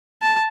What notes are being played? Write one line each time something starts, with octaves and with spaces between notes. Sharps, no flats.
A5